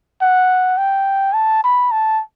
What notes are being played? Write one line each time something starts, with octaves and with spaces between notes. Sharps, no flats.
F#5
G5
A5
B5
A5